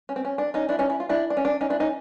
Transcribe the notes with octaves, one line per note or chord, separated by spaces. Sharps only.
C#4
C4
C#4
D4
C#4 D#4
D4 E4
C#4 D#4
E4
F4
D4 E4
D4
C#4
D4
C#4 D#4
D4 E4
C#4 D#4